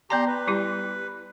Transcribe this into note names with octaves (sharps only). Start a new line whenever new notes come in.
B3 G4 D5 A5 A#5 C6
B4
G3 E4 G4